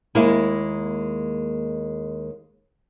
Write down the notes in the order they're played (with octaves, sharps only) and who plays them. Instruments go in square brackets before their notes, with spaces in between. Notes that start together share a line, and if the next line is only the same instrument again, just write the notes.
[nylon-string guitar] D#2 G#3 A#3 E4 G#4